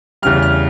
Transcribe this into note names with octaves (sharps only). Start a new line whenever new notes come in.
E2 C#3 G3 F6
F6